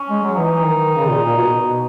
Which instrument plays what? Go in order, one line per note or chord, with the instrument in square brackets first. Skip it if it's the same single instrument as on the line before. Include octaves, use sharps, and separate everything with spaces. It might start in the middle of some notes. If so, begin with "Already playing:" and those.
Already playing: [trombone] C#4
[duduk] G#3
F#3
[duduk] E3 [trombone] D#4
[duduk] D#3
C#3
A#2
A#2
B2
B2